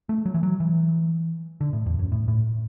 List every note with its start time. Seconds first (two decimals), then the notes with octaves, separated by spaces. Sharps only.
0.09 A3
0.26 F#3
0.34 E3
0.43 F#3
0.60 E3
1.61 D3
1.73 A2
1.86 E2
1.99 F#2
2.12 A2
2.28 A2